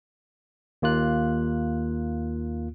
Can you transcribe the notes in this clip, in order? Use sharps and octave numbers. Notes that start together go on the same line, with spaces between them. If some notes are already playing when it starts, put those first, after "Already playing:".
D#2 A#3 F4 F#6